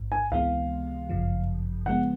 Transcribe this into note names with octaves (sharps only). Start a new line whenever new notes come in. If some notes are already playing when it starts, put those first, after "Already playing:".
Already playing: A1 G#2
G#5
C#2 C3 E3 G#3 B3 F5
G1 F#2 C#3 F3
C#3 F3 G#3 B3 F#5